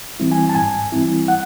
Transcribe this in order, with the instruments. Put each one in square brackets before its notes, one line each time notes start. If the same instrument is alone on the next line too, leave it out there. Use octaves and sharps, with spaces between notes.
[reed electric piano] E3 G3 C4 E4
G#5
A5
G#2 G#5
E3 G3 C4 E4
F#5